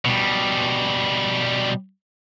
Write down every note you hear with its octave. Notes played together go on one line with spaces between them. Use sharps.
B2 G3